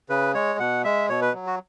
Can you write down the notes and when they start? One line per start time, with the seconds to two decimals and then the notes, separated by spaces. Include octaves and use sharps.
0.09 C#3 B4
0.34 G#3 C#5
0.59 B2 F#5
0.84 G#3 E5
1.09 B2 C#5
1.22 B4
1.34 F#3
1.46 F#4